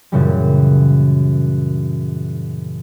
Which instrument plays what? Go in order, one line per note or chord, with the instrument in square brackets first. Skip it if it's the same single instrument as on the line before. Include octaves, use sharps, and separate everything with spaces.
[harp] F#2 A#2 C#3 E3 G3